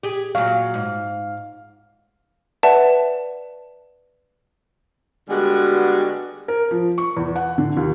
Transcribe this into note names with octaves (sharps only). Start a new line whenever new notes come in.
G4 G#4
A#2 F#3 F5
G#2
B4 D5 E5 F#5 A5
D3 G3 G#3 B3 F#4 G#4
A#4
F3
C#6
E2
F#5
D3
D#2